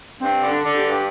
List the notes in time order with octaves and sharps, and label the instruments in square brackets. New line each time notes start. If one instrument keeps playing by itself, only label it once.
[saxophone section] G2 [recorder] C4
[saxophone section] D3
[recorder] D4
[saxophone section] D3
[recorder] G4
[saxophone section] G2
[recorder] G4